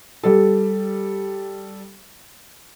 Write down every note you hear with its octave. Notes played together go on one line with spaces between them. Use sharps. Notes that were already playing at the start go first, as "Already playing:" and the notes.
G3 A4